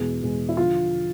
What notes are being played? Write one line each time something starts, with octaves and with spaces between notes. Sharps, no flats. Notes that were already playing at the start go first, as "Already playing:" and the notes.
Already playing: E2 B2 G#3 G#4
E2 B2 G#3
E4
D3 F3 F4